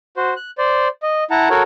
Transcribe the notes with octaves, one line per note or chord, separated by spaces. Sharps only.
F#4 C5
F#6
C5 D5
D#5
E4 F#5 A5 A#5
F#4 A4 A#4 C#5